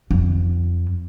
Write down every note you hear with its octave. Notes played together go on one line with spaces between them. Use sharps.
F2